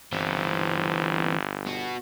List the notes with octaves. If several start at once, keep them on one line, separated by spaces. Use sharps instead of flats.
G1 E3 C4
B3 F#4